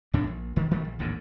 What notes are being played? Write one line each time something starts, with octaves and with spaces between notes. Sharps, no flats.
D#2 A2 D#3 D4
A#1
E1 D#3
E1 D#3 F3 A3
A#1
A1 D#2 G#2 D3